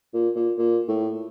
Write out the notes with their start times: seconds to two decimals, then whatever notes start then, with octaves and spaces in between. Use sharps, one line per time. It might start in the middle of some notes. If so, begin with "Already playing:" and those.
0.13 A#2
0.36 A#2
0.58 A#2
0.88 A2